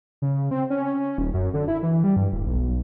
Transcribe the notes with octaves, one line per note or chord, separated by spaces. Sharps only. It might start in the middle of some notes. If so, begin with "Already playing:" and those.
C#3
C4
C#4
D#1
F#2
D3
E4
E3
G3
G2
D1
B1